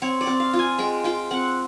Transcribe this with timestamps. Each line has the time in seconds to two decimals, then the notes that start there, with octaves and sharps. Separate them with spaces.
0.02 C4 C#5
0.21 D5
0.27 C4
0.40 F5
0.53 F4
0.59 G#5
0.78 G#3 G5
1.04 F4 G5
1.31 C4 F#5